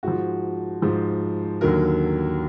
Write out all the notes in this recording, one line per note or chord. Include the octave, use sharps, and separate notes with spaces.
G#2 F3 F#4
G#2 F3
D#2 D3 F#3 A#4